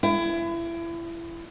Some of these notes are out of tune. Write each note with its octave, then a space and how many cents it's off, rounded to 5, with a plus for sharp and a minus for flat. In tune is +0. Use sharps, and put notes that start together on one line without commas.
E4 +30